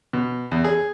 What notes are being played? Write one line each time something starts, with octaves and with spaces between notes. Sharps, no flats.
B2
E2
G#4